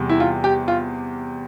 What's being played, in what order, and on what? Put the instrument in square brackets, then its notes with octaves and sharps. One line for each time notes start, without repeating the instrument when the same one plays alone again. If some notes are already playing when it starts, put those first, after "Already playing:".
Already playing: [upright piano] E2 C3 G3
[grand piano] E4
F4
G4
F4